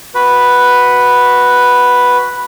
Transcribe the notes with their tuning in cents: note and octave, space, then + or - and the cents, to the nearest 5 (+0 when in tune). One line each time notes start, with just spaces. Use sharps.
F#4 +0 B4 +0